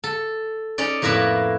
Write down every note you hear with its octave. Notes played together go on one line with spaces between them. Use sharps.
A4
C#4 D#4 D5
F2 A2 A#3 E4 B4